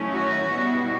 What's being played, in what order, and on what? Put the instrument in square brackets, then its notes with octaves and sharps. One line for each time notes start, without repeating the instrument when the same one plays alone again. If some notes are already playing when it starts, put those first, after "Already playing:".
Already playing: [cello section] D#3 F#3 A3 C#4 E4
F#4
B2 G3 B3 E4